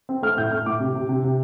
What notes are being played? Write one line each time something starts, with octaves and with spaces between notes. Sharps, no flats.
C4
A3 F6
A2 G6
A3 F6
A2 D6
C3
C3
C3
C3